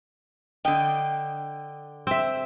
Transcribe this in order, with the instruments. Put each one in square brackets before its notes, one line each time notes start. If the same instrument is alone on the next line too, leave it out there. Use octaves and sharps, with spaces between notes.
[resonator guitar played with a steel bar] D3 D#5 [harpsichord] G5
[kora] C4 E5